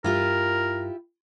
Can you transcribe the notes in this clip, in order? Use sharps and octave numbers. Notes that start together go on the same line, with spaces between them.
G2 E4 F4 G4 A#4